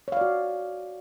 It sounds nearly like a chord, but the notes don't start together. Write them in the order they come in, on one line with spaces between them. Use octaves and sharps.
C#5 F5 D5 F#4